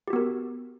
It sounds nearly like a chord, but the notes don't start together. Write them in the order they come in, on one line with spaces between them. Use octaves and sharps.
G4 F#4 B3 A#4